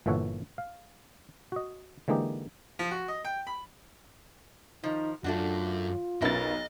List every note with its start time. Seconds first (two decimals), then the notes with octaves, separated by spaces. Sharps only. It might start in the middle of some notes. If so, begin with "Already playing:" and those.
0.06 G1 A#2 E3 A4 C#5 F#5
0.58 F5
1.52 F#4 D#5
2.08 D3 E3 G#3 A#3 D#4 G4
2.79 F3
2.91 F#4
3.08 D#5
3.25 G5
3.47 B5
4.84 D#3 F3 D#4
5.24 F#2 A3 D4 F4 F#4
6.22 B1 C#4 A#4 B4 D#5 A6